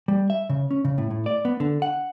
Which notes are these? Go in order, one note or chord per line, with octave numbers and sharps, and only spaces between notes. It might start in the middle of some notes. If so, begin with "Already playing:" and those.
G3
E5
C#3
C#4
C#3
A2
A2
D5
B3
D3
F#5